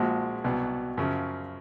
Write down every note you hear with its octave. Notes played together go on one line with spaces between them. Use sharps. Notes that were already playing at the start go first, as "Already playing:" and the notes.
Already playing: A#1 A#2 F3 G#3 F#4
C2 B2 F#3
F#2 C#3 F3